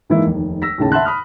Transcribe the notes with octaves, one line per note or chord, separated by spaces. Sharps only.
G#2 E3 A#3 E4
F1 D#2
E6 A#6 B6
D#2 A2 C#3 A5
E5 F#5 A5 B5 C6 F#6
B5 D#6 F6